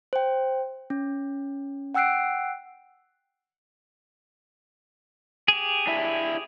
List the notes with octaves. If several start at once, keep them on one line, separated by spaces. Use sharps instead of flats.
C5 G5
C#4
F#5 G5 E6 F#6 C7 D7
G4 G#4
D4 E4 E5